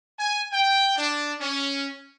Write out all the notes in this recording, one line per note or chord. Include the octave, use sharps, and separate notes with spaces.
G#5
G5
D4
C#4